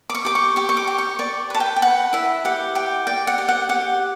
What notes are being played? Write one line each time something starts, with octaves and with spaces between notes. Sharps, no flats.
D6
C#6
G4 D6
C#6
G4 C#6
C#6
D6
G4
C#6
D5 C#6
B4 A5
G5
G5
B4 F#5
E4 E5
G4 F#5
G4 G5
D5 G5
F#5
G4
F#5
G4 F#5